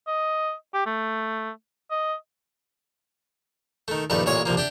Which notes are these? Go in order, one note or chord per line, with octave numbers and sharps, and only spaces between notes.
D#5
G4
A3
D#5
D#3 A3
A#1 G2 D#3 A3 B4
A1 A#2 C#5 C#6
C2 F3 A#3
D4 G4 E5